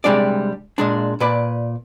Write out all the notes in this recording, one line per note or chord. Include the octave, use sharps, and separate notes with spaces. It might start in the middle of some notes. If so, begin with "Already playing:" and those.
C3 F3 G3 G#3 D4 D5
A#2 G#3 D4
A#2 B4 D5